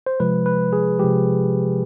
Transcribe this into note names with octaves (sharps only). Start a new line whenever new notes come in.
C5
C3 F3 G#3 B4
B4
G#4
C3 F3 G#3 G4